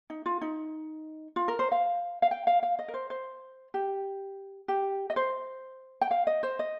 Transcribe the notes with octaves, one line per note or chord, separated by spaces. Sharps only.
D#4
F4
D#4
F4
A#4
C5
F5
F5
G5
F5
F5
D#5
A#4
C5
C5
G4
G4
D#5
C5
G5
F5
D#5
C5
D#5